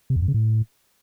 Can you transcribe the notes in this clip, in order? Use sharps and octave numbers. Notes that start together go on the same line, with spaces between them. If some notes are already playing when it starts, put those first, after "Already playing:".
C3
E2
F#2
C#3
A2